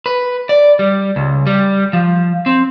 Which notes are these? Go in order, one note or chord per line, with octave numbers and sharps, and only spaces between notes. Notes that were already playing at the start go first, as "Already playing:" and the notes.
B4
D5
G3
C#2
G3
F3
C4